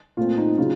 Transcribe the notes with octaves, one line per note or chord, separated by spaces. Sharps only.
A#2 A3 C4 F4
D#4
C#3 F#3 F4